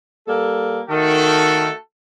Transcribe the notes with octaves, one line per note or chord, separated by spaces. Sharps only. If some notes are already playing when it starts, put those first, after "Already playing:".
G3 A#3 A4
D#3 A3 F#4 A4